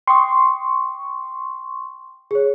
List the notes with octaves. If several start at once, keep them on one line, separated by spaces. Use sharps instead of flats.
G5 C6 C#6 D#6
G#4 C#5